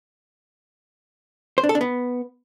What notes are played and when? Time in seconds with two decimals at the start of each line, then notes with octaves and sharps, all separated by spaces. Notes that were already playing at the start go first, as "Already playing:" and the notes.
1.58 C5
1.64 D4
1.69 A4
1.75 D4
1.81 B3